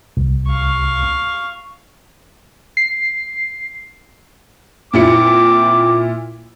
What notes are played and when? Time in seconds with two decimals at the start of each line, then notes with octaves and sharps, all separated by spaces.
0.17 C2
0.47 F5 C#6
2.77 C7
4.94 A#2 C4 E4 D6 C#7